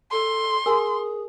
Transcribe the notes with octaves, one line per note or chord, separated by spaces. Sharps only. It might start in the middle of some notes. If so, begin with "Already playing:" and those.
A4 C6
G#4 A#4 G#5